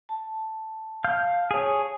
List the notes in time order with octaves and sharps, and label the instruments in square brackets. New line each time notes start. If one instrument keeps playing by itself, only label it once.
[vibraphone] A5
[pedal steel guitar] F5 F6 G6
G#4 C#5